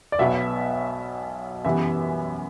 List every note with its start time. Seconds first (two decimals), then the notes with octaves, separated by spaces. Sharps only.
0.12 D5
0.19 B1 B2 F#3 B3 E5
1.65 F#2 E3 G3 B3 E5